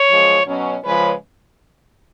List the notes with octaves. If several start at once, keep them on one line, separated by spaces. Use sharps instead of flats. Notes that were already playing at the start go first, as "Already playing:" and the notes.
Already playing: C#5
F#2 F3 G#3
B2 F#3 C#4
C#3 F3 G#3 C#4 B4